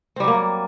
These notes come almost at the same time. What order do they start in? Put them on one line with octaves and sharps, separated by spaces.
C4 G3 F#3 A#3